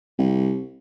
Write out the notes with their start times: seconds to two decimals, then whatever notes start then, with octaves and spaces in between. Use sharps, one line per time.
0.18 C2